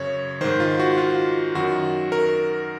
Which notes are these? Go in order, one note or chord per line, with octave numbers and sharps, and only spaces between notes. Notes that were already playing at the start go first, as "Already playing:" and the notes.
Already playing: F#2 C#3 C#5
G#2 D#3 C5
F4
F#4
F4
F#2 D#3 F#4
A#4